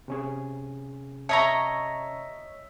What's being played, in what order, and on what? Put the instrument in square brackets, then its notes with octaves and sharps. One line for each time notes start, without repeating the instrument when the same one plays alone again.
[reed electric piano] C3 C#4 G#4
[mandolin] C#5 D#5 A#5 [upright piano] E5 [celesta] A5 A#6